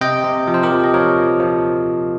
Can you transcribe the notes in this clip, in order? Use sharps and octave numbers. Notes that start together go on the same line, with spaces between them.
C3 D#5 G5
C3
F3
C5
G4 A#4
F3
D#5
F3 A#4 C#5
F3
F3